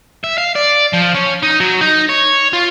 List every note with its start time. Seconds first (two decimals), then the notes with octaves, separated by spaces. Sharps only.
0.24 E5
0.38 F5
0.55 D5
0.93 F3
1.15 C#4
1.43 D#4
1.60 F#3
1.81 D#4
2.09 C#5
2.53 F4